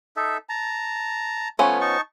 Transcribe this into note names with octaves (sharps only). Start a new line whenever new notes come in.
D#4 A4 E5
A5 A#5
F3 A3 B3 C#4 C#5
D#4 A5 C#6